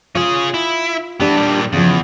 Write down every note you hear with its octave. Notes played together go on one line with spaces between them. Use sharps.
C#4 F4 G#4
E4
E3 B3 D4 G4
A#2 G3
E2 C#3 F3